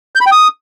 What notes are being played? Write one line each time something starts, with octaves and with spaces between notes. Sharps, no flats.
G6
B5
G5
D#6